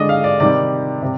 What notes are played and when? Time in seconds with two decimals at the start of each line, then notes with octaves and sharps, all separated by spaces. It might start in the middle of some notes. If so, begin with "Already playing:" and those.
Already playing: D3 G#3 D5 D#5
0.09 F5
0.24 D5
0.40 C3 D#3 G3 D5
1.02 C3